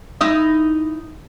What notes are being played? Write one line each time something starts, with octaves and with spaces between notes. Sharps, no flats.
D#4 E4 D#5